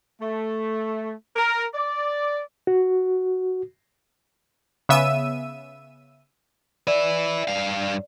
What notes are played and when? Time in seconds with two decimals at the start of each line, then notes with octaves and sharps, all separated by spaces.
0.21 A3
1.36 A#4
1.74 D5
2.67 F#4
4.89 C#3 B3 E5 E6 D#7
6.87 B4 D5 E5
7.48 G2 F5